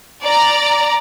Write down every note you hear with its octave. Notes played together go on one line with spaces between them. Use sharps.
D5 A#5